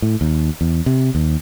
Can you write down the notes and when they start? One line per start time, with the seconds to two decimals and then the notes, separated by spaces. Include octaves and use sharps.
0.02 A2
0.21 D#2
0.61 E2
0.86 C3
1.15 D#2